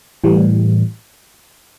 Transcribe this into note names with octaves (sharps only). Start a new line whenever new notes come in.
A2 E3 G3